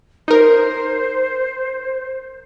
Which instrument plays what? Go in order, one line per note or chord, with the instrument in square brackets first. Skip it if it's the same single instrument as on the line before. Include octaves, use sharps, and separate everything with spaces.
[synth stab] D#4 A#4 [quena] C5